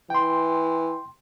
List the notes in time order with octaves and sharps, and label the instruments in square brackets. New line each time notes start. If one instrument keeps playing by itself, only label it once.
[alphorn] E3 [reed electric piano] G5 C6